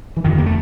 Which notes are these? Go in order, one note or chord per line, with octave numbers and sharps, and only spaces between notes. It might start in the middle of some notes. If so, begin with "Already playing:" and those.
E3
F2 D3 D#3
A#3
A3